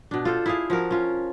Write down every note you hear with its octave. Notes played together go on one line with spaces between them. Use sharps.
B2 D4
F4 A4 C5
E4 G#4 F5
F3 F#4 A#4
C#4 F4